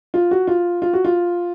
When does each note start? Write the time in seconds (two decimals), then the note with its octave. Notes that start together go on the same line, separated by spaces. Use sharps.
0.14 F4
0.31 F#4
0.47 F4
0.82 F4
0.93 F#4
1.05 F4